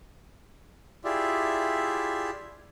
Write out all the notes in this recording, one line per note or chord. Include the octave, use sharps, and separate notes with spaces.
E4 F4 G4 G#4 D5 E5